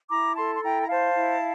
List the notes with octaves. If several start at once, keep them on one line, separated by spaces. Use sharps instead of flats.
E4 A#5 D6
A4 A5 C6
C6
E4 G5 A#5
A#5
C5 F5 A5
E4